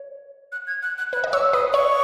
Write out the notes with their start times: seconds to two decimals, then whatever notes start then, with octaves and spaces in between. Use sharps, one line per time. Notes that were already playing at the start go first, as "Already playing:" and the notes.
Already playing: C#5
0.52 F#6
0.67 G#6
0.83 F#6
0.98 F#6
1.13 B4 F#6
1.24 D#5
1.33 C#5 E6
1.53 B4 D#6
1.73 C#5 C#6